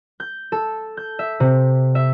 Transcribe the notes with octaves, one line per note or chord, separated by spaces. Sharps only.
G6
A4
G6
E5
C3
E5